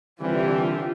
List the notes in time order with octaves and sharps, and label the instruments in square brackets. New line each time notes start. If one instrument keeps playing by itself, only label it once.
[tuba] C2 [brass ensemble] D3 E3 [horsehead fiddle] F4 G4